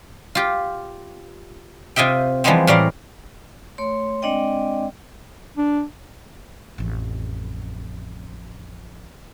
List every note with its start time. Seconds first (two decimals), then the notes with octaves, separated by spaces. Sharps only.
0.35 F4 G4
1.96 C3 F4 D#5 E5 G5
2.44 E3 F3 G3 G#3 B3 C4
2.67 A2 E3 G3 A#4 D5 F5
3.78 A3 C#5 C6
4.22 G#3 C4 D4 D5 D#5 G5
5.57 D4
6.78 A1 F2